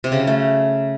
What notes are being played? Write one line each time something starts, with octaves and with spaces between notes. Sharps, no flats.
C3
C#3
F#3
A3